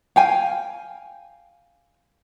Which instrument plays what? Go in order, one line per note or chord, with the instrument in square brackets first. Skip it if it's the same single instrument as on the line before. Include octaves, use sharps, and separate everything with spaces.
[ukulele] F5 G5 G#5